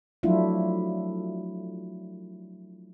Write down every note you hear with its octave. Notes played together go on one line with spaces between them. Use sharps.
F3 F#3 A3 D4 E4 F4